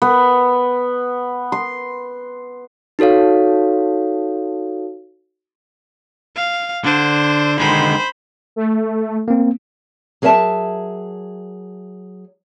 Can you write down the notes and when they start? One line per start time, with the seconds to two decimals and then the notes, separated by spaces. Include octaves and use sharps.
0.02 B3
1.52 C6
2.99 D#4 F#4 A4 C#5 F5
6.36 F5
6.85 D3 D4 C5
7.59 D3 D#3 G#3 C5 B5
8.56 A3
9.28 A#3 C4
10.22 F#3 G#4 A#4 C#5 E5 A5